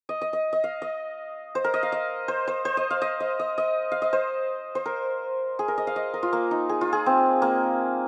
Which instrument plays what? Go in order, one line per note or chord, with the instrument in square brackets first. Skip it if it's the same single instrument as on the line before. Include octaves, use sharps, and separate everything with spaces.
[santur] D#5
D#5
D#5
D#5
F5
D#5
C5
A#4
D#5
F5
D#5
C5
C5
C5
D#5
F5
D#5
D#5
D#5
D#5
F5
D#5
C5
C5
A#4
G#4
A#4
D#5
F5
D#5
A#4
F4
A#3
D#4
G#4
F4
G#4
C4
A#3